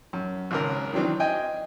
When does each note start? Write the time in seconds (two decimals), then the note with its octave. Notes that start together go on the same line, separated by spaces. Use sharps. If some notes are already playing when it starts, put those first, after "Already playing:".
0.13 F#2
0.51 G#1 C#2 A#4
0.93 D#3 E3 F#3 C4 D4
1.20 D#5 G5 G#5